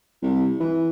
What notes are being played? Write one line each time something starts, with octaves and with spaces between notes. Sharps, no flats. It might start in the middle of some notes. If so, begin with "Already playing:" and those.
C2
E3